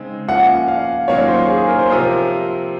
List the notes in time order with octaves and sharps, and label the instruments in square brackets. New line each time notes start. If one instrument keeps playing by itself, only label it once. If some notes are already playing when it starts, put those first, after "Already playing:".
Already playing: [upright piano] C#3 G#3 C4 D#4
[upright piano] F3 A#3 C#4 F4 [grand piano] F#5
[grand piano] F5
[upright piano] D#3 F#3 A#3 C#4 F4 [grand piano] C#5
[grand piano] C5
G#4
A#4
C5
[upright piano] C3 F3 C4 F4 [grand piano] A#4